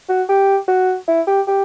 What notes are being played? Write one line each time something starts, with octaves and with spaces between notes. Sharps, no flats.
F#4
G4
F#4
E4
G4
G4